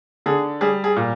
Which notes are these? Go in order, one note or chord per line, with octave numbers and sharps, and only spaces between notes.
D3 G#4
G3 G#4
G#4
A#2